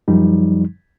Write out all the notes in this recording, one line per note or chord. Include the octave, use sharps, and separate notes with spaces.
F#2 F3 G3 D#4